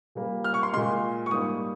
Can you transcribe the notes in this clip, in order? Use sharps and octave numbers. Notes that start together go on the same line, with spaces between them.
A#2 G3 A#3
F6
C#6
C6
A#2 G#3 C6
C#6
G#2 G3 A#3 D#6